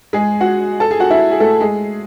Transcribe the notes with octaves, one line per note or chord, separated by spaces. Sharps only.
G#3 G#4
F#4 F#5
A4 A5
G#4 G#5
F#4 F#5
E4 E5
G#4
A3 A4
G#3 G#4